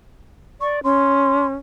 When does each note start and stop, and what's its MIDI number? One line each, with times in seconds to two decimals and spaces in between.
0.61 0.80 74
0.61 0.77 85
0.84 1.54 61
0.84 1.46 84